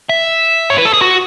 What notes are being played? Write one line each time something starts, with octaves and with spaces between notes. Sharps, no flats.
E5
C#5
B4
A4
G#4
F#4